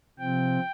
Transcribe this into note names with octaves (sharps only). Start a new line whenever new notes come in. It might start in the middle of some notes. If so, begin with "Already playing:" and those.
C3 F3 C4 G5